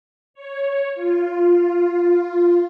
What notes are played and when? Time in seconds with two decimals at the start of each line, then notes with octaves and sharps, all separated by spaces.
0.34 C#5
0.95 F4